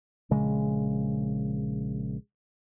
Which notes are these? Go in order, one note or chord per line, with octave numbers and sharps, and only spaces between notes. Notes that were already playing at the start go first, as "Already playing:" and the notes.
A#1 C#3 G#3